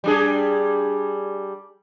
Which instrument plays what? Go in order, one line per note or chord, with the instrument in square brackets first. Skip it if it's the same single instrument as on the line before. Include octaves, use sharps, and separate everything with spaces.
[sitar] G3 D4 G#4